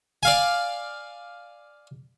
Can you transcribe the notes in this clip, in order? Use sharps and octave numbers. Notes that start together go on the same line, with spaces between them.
D5 F5 G#5